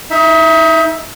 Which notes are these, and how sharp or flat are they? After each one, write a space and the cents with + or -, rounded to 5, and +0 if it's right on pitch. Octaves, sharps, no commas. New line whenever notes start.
D#4 +30 E5 +0